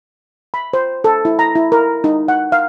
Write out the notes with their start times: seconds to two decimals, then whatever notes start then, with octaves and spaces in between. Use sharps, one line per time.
0.54 B5
0.73 C5
1.04 A4
1.25 E4
1.39 A#5
1.55 E4
1.72 A#4
2.04 D#4
2.28 F#5
2.52 F5